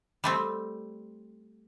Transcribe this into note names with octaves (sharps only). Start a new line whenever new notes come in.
G3 A3 C4